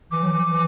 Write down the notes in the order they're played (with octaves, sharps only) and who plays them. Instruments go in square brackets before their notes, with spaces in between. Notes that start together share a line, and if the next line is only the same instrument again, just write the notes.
[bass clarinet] E3 [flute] D6
[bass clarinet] F#3
E3
E3